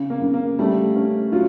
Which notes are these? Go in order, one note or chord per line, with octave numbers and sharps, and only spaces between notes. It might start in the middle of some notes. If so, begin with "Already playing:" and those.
Already playing: C#3
A#3
C#3
A#3
G3 A3
C#4
F#3 F4